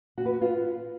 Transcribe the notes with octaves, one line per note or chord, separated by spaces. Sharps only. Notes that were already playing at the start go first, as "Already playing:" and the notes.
F#4
B4
F#4
F4